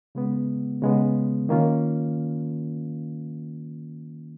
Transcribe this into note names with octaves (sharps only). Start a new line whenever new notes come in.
C#3 G#3 B3
C#3 G#3 B3
D#3 A#3 C#4 F4